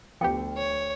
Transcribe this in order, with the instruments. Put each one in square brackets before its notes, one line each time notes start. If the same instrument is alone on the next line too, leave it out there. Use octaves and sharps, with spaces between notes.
[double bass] D2 [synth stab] F3 B3 G4 [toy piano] G5
[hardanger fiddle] C#5